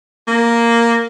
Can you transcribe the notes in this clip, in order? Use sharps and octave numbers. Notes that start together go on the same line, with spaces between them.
A#3